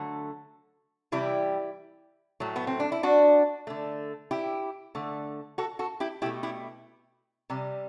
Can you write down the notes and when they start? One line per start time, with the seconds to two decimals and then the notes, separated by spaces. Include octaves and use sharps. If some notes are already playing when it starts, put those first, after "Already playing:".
Already playing: D3 F#3 A3
1.12 C3 E3 G3 E4 G4
2.40 A2 F#3 A3
2.56 B3
2.67 C4
2.80 D4
2.92 E4
3.03 D4 F#4
3.67 D3 A3
4.31 E4 G4
4.95 D3 A3
5.58 F#4 A4
5.79 F#4 A4
6.00 E4 G4
6.22 B2 E4 G4
6.26 A3
6.43 E4 G4
7.50 C3 G3